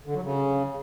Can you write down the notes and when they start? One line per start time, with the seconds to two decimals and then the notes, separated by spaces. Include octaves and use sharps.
0.06 D3
0.15 F#3
0.23 C#3